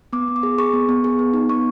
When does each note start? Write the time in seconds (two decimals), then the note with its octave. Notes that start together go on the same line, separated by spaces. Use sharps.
0.13 B3 D6
0.28 B3
0.36 D6
0.43 G#4
0.58 G#4 C#6
0.73 B3
0.89 B3
1.04 G#4
1.19 B3
1.34 D#4
1.49 B3 C#6